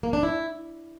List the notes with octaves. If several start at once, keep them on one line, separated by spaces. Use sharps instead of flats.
A#3
D4
E4